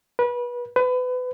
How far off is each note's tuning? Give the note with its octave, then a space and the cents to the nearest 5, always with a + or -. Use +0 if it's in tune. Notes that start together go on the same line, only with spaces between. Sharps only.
B4 -25
B4 +30